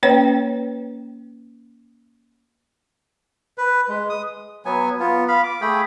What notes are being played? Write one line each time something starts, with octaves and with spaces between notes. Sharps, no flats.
A#3 C#4 B4 C#5 G5
B4
G#3
D#6
F#3 B3 G#5
B3 F4
F5 B5
D6
A3 G#4 G5 B5